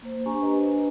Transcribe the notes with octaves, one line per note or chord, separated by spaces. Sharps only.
A#3 C5
D4 G4 C5 G#5 A#5 C#6
D4 B4 D#5